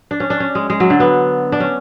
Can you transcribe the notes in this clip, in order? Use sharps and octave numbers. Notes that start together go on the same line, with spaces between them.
D4
C#4
D4
C#4
G#3
G#3
F#3
D3
B3
D4
C#4